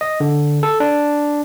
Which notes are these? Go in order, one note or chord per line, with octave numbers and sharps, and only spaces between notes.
D#5
D3
A4
D4